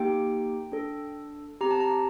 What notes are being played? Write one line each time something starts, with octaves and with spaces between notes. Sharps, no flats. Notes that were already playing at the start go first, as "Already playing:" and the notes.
Already playing: A#3 D#4 G4 G5
D4 A4
C4 G4 A#5
A5
A#5